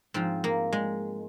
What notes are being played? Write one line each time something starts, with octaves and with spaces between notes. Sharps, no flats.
G#2 F3 C4
A#3
G#3